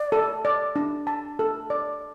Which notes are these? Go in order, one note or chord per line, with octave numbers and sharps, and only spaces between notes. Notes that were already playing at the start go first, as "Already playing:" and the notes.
Already playing: D5
A4
D5
D4
A5
A4
D5